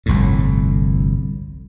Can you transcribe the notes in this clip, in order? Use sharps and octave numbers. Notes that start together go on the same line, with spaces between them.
G1 C2 F2 A2